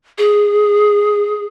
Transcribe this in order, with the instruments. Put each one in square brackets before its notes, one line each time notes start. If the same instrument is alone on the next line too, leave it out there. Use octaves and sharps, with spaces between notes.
[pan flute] G#4